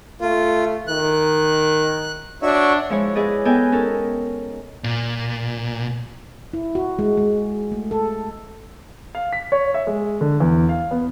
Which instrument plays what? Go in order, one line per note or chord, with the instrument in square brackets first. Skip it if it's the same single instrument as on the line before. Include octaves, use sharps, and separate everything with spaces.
[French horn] A3 [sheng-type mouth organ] F4
[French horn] D#3 [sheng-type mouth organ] F#6
[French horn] D4 [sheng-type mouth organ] F#4 C#5 E5
[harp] F3 G#3 E4 C#5
E4 G#4 B4 D5 D#5
B3 A4 D#5 G5 G#5
C#4 D#4 A4 A#4
[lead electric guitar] A#2
[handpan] E4
F#4
G#3
G#3
A3
A4
[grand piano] F5
B6
C#5
E5
G#3
D3
E2
F5
B3